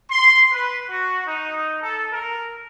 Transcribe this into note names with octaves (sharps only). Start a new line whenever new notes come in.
C6
B4
F#4
D#4
A4
A#4